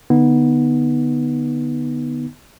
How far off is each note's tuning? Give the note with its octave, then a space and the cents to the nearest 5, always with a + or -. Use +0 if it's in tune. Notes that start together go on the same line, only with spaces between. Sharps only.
D3 +0 B3 -10 D#4 +0